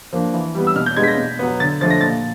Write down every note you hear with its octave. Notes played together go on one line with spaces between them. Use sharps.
F3 A#3 D4
E3
G3 B3
E6
B2 F6
G6
G#3 B3 D4 G#6
B6
A#6
B2
F#3 B3
D3 A6
F3 A3 D4 A6
A#6
A#2 A6